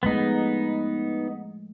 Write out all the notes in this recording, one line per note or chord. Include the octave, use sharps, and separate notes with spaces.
F3 G#3 A3 B3 D#4